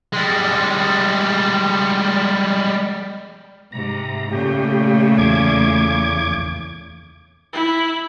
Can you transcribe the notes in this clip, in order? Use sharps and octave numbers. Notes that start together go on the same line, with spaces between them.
G3 G#3
G#2 C3 A#5
A#2 C#3 A3 G4
E2 D6 G#6
E4